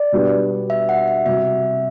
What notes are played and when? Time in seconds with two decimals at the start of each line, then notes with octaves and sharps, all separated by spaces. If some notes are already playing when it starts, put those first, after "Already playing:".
Already playing: D5
0.12 B2 G3 B3 D4 G4
0.70 E5
0.89 F#5
1.08 E5
1.26 C3 G3 C4 F#4 E5